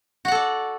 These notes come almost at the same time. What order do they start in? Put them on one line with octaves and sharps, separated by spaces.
F#4 F#5 A4 D5